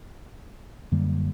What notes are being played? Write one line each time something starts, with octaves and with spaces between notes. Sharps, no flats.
F#2 D3 G3 A#3